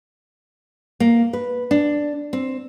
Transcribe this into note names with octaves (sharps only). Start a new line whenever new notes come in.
A#3
B4
D4
C4